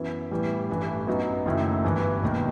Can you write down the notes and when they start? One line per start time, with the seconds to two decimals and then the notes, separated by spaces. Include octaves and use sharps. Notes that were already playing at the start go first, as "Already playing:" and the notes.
Already playing: F#2 E3 B3 E4
0.31 A2 E3 G3 B3 E4
0.70 A1 G2 E3 A3
1.07 F#2 F#3 B3 D#4
1.45 F#1 F#2 D#3 A3 E4
1.85 G1 G2 E3
2.23 E1 D#2 D#3